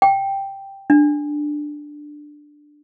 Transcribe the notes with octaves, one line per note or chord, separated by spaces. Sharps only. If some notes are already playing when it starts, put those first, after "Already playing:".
G5
D4